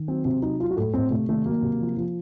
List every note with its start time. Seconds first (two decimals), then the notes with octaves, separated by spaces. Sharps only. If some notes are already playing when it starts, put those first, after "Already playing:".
Already playing: D#3
0.08 F#3 C4
0.25 C3 C4
0.42 F#3 D#4
0.60 F#3 F4
0.71 F#4
0.77 A2 A4
0.93 A2 C4
1.11 C3 A3
1.28 D#3 A3
1.45 F#3 A#3
1.63 C3
1.81 F3
1.97 F3